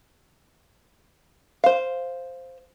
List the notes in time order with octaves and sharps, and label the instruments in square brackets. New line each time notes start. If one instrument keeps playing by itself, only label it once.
[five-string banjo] C5 F5